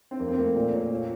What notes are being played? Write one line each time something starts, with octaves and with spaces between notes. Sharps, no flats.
C4
F2 A#3
C4
A3 A#3
A#2
C#4
F3